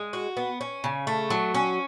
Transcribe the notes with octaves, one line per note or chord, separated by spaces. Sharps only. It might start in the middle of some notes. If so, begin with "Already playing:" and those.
Already playing: G#3
F#4
B3
C#4
C#3
A3
F#3
C#4